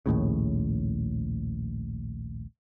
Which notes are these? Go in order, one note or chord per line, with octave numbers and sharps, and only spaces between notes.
A#1 D#2 A2 C#3